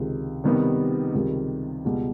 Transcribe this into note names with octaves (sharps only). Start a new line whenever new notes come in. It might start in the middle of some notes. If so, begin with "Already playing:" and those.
Already playing: C#2 C3 D#3
C3 D#3 G3 B3 D#4
C#2 C3 D#3 G3
C#2 B2 G3